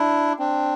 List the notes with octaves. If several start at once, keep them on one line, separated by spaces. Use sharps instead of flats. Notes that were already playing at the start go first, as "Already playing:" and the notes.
Already playing: D4 E4
C4 D4